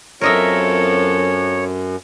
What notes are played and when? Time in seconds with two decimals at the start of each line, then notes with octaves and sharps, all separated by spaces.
0.21 F#2 C4 F4 A4 A#4 C#5 D#5 E5